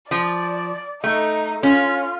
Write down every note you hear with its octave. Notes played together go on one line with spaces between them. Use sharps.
F3 D5
A3 D#4
C#4 F4